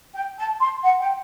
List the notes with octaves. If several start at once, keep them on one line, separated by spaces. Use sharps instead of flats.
G5
A5
C6
F#5
G5